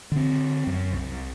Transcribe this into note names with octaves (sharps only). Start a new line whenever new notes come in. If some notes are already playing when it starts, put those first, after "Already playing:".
D3 C4
F#2
C2